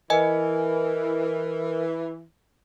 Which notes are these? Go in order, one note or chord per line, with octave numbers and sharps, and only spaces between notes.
E3 A#4 D#5 G#5